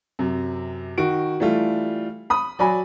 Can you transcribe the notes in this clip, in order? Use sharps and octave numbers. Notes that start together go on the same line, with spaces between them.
F#2 C3
D#3 F#4 D7
E3 G3 A3 F4
B5 D#6
F#3 D5 G#5 B5